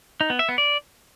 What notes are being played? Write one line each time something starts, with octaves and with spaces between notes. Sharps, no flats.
D#4
B3
E5
B3
D5